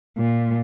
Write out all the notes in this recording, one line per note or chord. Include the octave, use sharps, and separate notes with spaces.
A#2